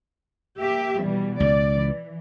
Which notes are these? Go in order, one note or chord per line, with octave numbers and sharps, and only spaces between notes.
A#3 G4 E5
B2 E3 G3
C#2 D5
E3